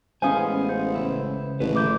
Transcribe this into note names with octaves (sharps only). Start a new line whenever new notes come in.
A1 G#3 B3 C#4 C5 F5 G#5 D#6
C5
C#2 B4 E5
A1 D3 G#3 B4
D3 F3 A3 A#3 D6 G6